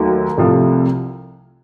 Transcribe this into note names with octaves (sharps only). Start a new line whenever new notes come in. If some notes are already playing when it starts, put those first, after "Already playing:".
Already playing: D#2 D#3 F#3 A3
C2 C3 F3 A3